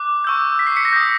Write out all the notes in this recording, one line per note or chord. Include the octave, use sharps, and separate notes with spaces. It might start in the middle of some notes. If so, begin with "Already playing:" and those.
Already playing: D6 F#6
C#6 E6 G6
B6
C7
B6 C#7
A#6
D#6 G6